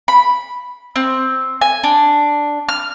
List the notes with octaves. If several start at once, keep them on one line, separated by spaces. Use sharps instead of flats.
B5
C4
G#5
D4
F6